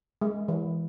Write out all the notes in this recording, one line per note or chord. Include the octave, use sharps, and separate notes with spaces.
G#3
E3